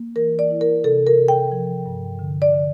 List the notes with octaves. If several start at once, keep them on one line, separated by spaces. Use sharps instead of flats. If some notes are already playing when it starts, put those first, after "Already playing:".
Already playing: A#3
E3 A#4
D5
E4
A#4
C3 A4
A#4
C3
G5
F3
G2
D3
D5
D3